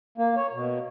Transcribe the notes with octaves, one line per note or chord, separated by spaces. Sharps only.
A#3
C#5
B2